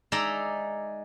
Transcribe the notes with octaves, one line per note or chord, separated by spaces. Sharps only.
G#3 D#4 D5 E5 A#5